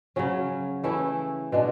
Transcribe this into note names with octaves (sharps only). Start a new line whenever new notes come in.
C#3 F#3 C#4
E3 A3 C#4 E4
B2 G#3 D4